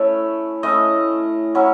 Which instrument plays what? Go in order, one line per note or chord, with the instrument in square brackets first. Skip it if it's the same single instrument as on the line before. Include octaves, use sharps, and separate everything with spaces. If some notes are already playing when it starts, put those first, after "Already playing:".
Already playing: [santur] A3 C#4 E4 C#5
A3 C#4 E4 D#5
F#3 C#4 E4